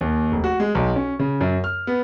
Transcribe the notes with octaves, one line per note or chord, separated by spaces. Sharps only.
D#2
F1
F#4
G#3
B1
C#4
C#3
F#2
F6
B3